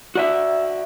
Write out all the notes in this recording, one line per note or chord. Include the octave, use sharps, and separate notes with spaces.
F#4 D5 E5